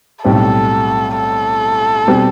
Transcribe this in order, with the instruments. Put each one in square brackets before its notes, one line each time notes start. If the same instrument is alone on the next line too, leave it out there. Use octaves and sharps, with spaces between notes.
[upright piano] B1 A2 G3 C4 [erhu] A4
[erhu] A4
[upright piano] B2 G3 C4